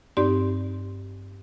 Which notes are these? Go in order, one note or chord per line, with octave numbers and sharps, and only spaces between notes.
G2 C4 D#4 G4 D5 C6